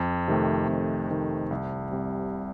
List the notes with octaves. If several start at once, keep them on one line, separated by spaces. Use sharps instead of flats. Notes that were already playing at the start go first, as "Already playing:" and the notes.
Already playing: F2
C3 D#3 A3
F2
C3 D#3 A3
C2
C3 G3